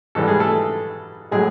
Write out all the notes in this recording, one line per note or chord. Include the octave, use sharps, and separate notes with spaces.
G#2 E3 G3 A4
G#4
A3 A4
A2 F#3 G#3 G#4